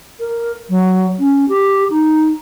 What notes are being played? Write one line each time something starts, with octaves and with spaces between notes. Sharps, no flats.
A#4
F#3
C#4
G4
D#4